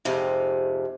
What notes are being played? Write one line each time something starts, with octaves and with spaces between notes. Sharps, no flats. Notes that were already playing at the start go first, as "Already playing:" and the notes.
F2 G#2 C3